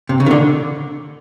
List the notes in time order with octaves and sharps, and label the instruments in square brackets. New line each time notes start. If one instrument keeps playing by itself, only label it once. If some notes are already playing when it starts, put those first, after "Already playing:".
[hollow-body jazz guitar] C3
C#3
D#3
D3